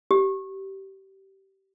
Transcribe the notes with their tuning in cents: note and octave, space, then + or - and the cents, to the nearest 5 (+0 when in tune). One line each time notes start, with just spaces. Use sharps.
G4 -25